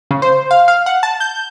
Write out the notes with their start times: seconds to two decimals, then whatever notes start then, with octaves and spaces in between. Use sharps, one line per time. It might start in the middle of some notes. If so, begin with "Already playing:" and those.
0.11 C#3
0.22 C5
0.51 F5
0.68 F5
0.86 F#5
1.03 A5
1.20 G6